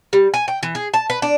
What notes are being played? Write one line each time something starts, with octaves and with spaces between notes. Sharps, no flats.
G3
G#5
G5
E3
G#4
A5
B4
D4